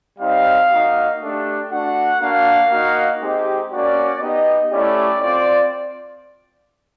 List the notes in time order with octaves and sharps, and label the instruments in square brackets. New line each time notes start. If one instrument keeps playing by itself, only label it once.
[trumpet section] G3 C4 D#4 F5
A#3 D#4 F#4
A3 D4 G4
A3 D4 F#4 F#5
A#3 D4 F#4 F5
A#3 D#4 F#4
G#3 C4 D#4 G4
A#3 C#4 F#4 D5
B3 D#4 G4 D#5
A3 C#4 E4 G4 D5
C4 F4 D5